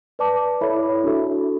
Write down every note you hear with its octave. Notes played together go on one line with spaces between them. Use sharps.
B4 D5 A5 D6
E4 A4 C#5 E5 B5
D4 F#4 A4 E5